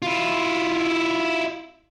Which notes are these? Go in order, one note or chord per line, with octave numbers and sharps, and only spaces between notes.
E4 F4